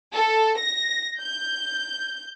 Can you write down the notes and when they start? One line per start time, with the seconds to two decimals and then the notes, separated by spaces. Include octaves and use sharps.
0.14 A4
0.58 A#6
1.21 G6